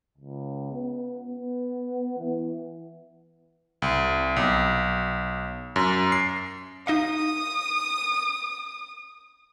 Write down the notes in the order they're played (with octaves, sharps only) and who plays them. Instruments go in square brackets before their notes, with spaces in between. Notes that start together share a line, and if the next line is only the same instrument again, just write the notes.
[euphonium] C#2
B3
B3
E3
[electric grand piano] C2
B1
F#2
C7
[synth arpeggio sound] D#4 D#5 F5 [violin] D#6